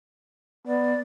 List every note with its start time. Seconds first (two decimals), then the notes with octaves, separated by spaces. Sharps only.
0.67 B3 D5